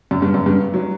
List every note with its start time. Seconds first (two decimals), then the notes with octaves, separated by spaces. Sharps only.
0.11 F#2
0.22 G2
0.34 F#2
0.46 G2
0.74 F#3